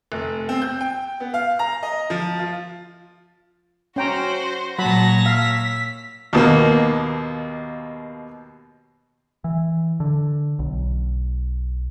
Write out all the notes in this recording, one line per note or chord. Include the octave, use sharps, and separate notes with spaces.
F1
C4
G6
G5
B3
F5
A#5
D#5
F3
F4
C#4 F#4 C5 G5 A#5
A#2 F#3 C#5 A5 B5 A#6
F5 E6 B6
D#2 B2 A#3
E3
D3
B1